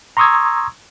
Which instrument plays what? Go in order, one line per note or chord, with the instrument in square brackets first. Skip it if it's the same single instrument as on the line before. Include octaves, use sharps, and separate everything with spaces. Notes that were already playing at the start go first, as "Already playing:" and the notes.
[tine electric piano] A#5 C6 C#6 D#6 E6 G#6